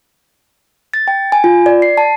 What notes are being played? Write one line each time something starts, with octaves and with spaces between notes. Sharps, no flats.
A6
G5
G#5
F4
D5
C7
A5